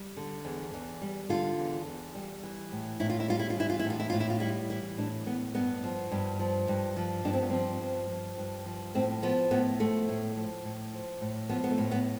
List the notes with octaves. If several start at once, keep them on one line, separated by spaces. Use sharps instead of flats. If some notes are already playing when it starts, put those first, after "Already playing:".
Already playing: G3
D3
E2
E2
G3
D3 F4
E2
E2
G3
E3
A2
A2 E4
F4
E4
G3 F4
E4
F4
E3 E4
F4
E4
A2
F4
E4
A2 F4
E4
F4
G3 E4
E3 E4
A2 D4
A2 B3
G2 B3
F3
G2
F3
G2
F3
G2 D4
C4
B3
F3 C4
G2
F3
G2
F3
A2 C4
F3 B3
A2 B3
F3 A3
A2
F3
A2
F3
A2
F3 B3
B3
A3
A2
B3